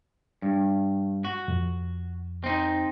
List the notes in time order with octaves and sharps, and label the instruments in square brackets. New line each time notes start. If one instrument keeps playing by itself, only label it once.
[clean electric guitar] G2
F#4
[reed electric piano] F2
[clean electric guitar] C4 D#4